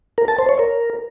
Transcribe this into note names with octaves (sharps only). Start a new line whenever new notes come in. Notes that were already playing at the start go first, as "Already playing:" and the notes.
A#4
A5
C5
C#5
A#4